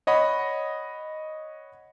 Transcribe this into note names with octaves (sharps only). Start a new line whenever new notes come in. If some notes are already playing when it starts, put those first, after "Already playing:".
C#5 D#5 F#5 B5